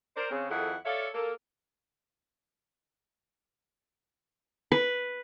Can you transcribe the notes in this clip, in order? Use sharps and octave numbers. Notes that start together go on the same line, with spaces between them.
A#4 C5 D5
C#3 C4
F2 D#3 E4 G#4 A4 F#5
A4 C#5 D5 E5 F5
A#3 A4
B4